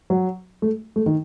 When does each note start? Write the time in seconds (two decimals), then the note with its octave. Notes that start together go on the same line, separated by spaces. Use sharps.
0.10 F#3
0.62 A3
0.96 A3
1.06 D#3